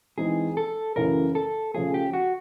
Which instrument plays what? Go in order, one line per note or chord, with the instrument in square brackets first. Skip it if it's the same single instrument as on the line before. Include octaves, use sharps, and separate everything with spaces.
[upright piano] E3 G#3 C4 D#4 [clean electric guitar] G#4
[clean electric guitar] A4
[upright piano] F#2 C#3 E3 A3 [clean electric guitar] A#4
[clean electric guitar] A4
[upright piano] C#3 F3 A3 [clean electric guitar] G#4
[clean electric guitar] G4
F#4